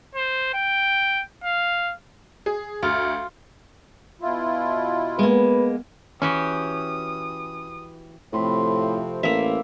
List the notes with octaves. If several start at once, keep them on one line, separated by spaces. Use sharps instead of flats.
C5
G5
F5
G#4
D2 F4
B2 E4 F4
G#3 A#3 B3 B4
E3 C#4 F#4 G4 D#6
A2 C3 F3 A3 C4 C5 B5
A1 A#3 E5